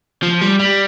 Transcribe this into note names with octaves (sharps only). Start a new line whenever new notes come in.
F3
G3
G3